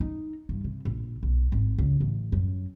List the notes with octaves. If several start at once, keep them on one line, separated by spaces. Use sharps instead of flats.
D#4
G2
C3
A#1
B1
G#1
C#2
A1
F#2